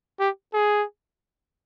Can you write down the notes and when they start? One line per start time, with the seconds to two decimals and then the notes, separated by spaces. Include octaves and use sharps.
0.19 G4
0.54 G#4